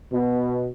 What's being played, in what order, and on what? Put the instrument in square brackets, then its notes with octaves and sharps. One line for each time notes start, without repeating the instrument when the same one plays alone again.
[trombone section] B2